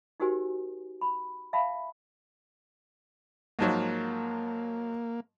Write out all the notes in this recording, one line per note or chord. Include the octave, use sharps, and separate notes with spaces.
D#4 F#4 G4 A#4 C5 G#5
B5
E5 F5 G5 A5 B5
G#2 F3 F#3 A#3